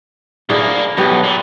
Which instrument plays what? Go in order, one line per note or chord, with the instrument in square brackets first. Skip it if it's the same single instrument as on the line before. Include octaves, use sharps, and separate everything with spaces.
[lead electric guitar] D2 A#3 [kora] D4 E4 G#4
[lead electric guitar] B1 [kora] G4 B4 D#5
[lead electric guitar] A#2